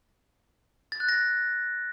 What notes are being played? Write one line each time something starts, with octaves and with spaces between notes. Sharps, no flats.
A6
F#6
A#6